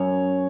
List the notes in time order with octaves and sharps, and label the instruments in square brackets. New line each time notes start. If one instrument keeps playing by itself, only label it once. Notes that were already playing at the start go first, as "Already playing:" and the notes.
Already playing: [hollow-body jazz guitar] F#2 [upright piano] C#5